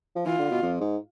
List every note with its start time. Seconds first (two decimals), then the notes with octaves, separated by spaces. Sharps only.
0.16 F3
0.26 E3 F4
0.39 D3
0.51 B2
0.63 F2
0.81 G#2